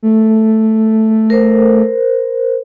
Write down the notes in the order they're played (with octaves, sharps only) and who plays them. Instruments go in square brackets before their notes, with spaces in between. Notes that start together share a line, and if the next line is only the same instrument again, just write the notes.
[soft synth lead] A3
[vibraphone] A#4 C5